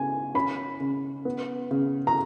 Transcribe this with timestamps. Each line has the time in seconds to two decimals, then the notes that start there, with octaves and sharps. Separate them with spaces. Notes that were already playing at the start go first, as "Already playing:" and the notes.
Already playing: C#3 B3 G#5
0.34 C#4 B5
0.80 C#3
1.25 B3
1.71 C#3
2.07 A#5